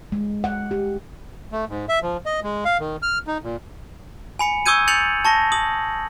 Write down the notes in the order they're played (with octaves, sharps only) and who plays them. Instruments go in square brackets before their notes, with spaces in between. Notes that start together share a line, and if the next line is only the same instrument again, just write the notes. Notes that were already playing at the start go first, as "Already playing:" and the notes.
[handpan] G#3
F#5
G4
[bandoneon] A3
G#2
E5
F3
D#5
G#3
F5
D#3
F6
D#4
A#2
[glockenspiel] G#5 B5 C#7
C#6 D#6 E6 G6 G#6 D#7
G6 A6 C#7 F7 F#7
A5 C#6 A#6
D#6 F#7